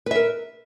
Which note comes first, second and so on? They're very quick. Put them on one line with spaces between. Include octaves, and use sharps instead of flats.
B4 E5 A#4